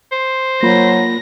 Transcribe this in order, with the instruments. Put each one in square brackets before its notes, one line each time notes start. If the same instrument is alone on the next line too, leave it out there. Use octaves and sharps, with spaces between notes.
[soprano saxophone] C5
[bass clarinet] F#3 [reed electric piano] A#3 F4 B5 [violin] A#6